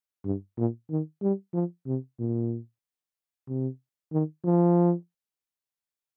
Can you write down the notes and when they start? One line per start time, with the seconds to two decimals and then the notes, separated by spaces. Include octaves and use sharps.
0.25 G2
0.57 A#2
0.90 D#3
1.22 G3
1.54 F3
1.87 C3
2.19 A#2
3.48 C3
4.13 D#3
4.44 F3